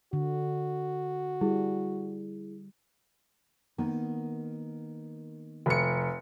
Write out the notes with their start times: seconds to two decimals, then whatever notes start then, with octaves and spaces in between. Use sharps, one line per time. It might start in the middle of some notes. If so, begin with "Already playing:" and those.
0.13 D3 F#4
1.41 G3 E4 G#4
3.78 D#3 A#3 B3
5.66 F1 C#7